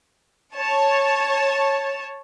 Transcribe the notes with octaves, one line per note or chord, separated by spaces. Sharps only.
C#5 A5